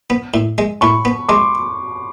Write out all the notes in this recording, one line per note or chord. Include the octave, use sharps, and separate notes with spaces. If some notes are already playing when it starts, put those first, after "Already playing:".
B3
A2
G#3
A2 B5 C#6
B3
G#3 C6 D6